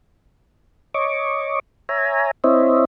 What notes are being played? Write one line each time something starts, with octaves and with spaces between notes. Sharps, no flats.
C#5 D#5 C#6 D6
C#5 E5 G#5 A#5
C4 E4 C5 C#5 D#5 E5